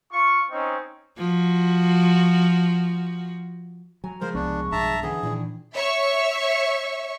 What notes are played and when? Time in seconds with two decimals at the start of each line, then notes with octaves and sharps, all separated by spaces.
0.11 F4 F5 C#6
0.51 C4 C#4 D#4
1.17 F3 F#4
4.04 F#3 G#5 A#5
4.21 C#3 F3 G#3 A#4 C5
4.35 C2 B3 D4 C#6
4.72 B1 G2 D4 E5 A5 A#5
5.03 D3 E3 C#4 G#4
5.23 A#2 D#3 E3 D4 E4
5.73 C#5 E5 C#6